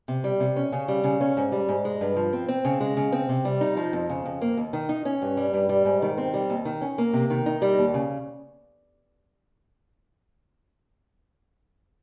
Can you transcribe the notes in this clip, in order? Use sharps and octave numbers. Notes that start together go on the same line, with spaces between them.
C3
G3
C3
C#4
C#3
G3
C#3
C#4
G#2
G3
G#2
G#3
G2
F3
C4
C4
C#3
G#3
C#3
C4
C3
G3
D#4
F3
F2
C#3
F2
A#3
D#2
D#3
D#4
C#4
G2
G3
G2
G3
G#2
D#3
C4
G3
D#2
D#3
C#4
A#3
C3
D#3
D#4
G3
D#2
C#3